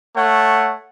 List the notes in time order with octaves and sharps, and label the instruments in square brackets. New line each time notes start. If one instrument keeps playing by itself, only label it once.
[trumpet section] A3 C#5 F#5